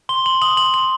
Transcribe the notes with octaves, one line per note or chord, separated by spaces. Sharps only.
C6 G7
C6 F#7
D#6 F#7
C6 F#7
C6 F#7